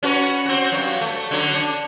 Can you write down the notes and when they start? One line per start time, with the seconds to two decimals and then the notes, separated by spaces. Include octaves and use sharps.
0.03 C#4 F#4 B4
0.45 C4 F#4
0.71 G2 F#3
1.01 A3
1.31 D3 F#3
1.55 D4